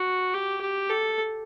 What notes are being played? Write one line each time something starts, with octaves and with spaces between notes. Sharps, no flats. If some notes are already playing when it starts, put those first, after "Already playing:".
Already playing: F#4
G4
G4
A4